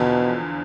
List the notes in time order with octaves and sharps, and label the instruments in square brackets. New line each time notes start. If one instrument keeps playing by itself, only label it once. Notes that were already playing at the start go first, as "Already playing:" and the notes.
Already playing: [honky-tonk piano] E2 D3 F3 [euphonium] B2